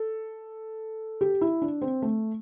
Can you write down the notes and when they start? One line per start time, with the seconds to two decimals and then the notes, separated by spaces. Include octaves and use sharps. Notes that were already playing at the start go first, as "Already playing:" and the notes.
Already playing: A4
1.21 G4
1.41 E4
1.62 D4
1.82 C4
2.02 A3